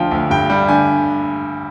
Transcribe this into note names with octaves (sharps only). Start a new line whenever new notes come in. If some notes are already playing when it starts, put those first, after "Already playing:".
Already playing: D2 D3 F3 F5 G5
D2
G2 G5
G3
D3 G#5